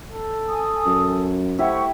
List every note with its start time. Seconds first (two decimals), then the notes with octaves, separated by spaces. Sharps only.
0.10 A4
0.47 G#5 D#6
0.86 F#2
1.59 A3 E4 G4 C5 E5 F#5 C#6